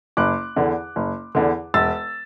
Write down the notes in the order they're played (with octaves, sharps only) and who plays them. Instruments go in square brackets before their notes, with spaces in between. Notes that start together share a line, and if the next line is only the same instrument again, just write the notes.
[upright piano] F#1 D6 F#6
E2 D3
F#1
E2 D3
E1 E6 A6